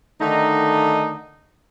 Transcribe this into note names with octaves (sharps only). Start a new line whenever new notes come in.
D3 D#3 A3 D#4